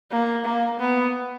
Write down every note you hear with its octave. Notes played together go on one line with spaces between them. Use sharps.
A#3
A#3
B3